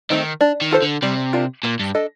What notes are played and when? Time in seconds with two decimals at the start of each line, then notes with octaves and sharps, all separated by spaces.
0.10 D#3 A3 C4 D#4
0.41 D4
0.61 D#3
0.71 F4 A4 C5
0.82 D3
1.02 C3 G3
1.33 D4 F4 A#4
1.63 A#2 A#3
1.80 G2
1.95 D4 A4 D#5